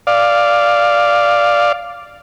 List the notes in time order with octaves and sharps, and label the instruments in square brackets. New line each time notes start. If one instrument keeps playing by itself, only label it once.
[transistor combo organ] D5 F5